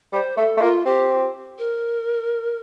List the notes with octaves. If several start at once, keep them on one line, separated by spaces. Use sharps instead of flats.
G3 C5
A3 A4
A3
A#3 F4
C4 G4
A#4